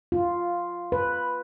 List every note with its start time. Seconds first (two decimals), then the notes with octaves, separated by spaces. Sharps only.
0.12 F4
0.92 B4